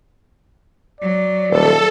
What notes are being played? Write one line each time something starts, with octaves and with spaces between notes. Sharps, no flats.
F#3 D5
D#1 A4